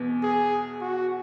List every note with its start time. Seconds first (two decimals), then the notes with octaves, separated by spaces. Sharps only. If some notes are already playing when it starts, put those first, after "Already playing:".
Already playing: E2 B2 B3
0.23 G#4
0.81 F#4